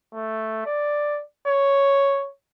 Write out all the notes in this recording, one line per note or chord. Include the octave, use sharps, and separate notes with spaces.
A3
D5
C#5